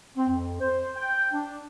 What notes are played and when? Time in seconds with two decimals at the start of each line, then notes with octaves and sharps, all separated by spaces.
0.17 C4
0.29 F2
0.60 C5
0.96 G5
1.33 D4